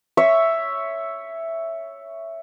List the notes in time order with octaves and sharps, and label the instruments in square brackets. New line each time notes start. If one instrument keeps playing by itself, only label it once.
[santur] C#5 E5